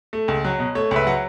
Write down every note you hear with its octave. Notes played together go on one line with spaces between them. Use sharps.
A3
C#2
F#3
B2
A3 C#5
C#2 B4 E5
F#3 F#5